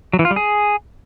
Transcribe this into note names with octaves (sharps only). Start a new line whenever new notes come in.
F#3
E3
F4
G3
G#4